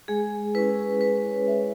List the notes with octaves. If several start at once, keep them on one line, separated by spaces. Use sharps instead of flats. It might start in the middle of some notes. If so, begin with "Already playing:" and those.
G#3 G#4
C#4 E4 B4
G#3 B4
C#5
C#4 E4 E5